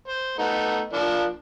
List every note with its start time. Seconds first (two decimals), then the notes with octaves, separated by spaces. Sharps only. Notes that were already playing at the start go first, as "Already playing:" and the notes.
0.08 C5
0.38 A3 B3 D#4
0.93 F3 A#3 D4